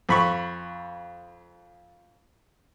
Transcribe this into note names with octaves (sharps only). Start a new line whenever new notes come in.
F2 B5 C#6